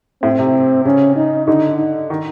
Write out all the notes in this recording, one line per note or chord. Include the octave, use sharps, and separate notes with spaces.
A2 C4
C3
C#3 C#4
D#4
D3 D#4
D#4
D#3